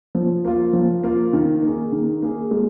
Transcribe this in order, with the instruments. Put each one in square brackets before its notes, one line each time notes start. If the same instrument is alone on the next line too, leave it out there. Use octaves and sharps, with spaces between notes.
[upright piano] F3
A#3 F4
F3
A#3 F4
D#3
A#3
G#4
D#3
A#3 G#4
G#3